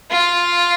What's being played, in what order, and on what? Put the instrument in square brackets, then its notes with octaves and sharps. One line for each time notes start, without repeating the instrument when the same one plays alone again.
[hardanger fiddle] F4